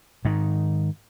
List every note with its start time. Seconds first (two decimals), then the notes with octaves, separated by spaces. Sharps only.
0.25 G#2 D#3